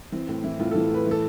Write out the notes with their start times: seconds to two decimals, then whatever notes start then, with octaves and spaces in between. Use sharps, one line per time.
0.12 E3 C4
0.28 A2 C4
0.44 E3 E4
0.59 A2 F4
0.71 A4
0.75 E3
0.90 A2 B4
1.06 E3
1.11 A4